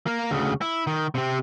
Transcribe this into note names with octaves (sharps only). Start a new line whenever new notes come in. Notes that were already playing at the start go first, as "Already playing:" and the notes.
A#3 A#4
D2 C#3
E4
D#3
C3 C4